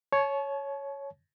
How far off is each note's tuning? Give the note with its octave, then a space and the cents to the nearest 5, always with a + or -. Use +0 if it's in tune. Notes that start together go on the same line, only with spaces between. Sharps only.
C#5 +0 A5 -40